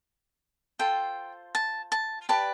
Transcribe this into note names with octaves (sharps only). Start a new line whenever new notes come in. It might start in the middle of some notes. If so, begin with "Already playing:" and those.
F4 A4 C5 G5
A5
A5
G4 B4 D5 A5